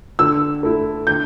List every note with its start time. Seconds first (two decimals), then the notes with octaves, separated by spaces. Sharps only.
0.19 D3 E6
0.63 A3 E4
1.07 D3 G6